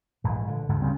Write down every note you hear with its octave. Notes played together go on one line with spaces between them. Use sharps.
A#1 G#2 E3
D3
D2 G#2 D3
C#3 G3 C4 C#4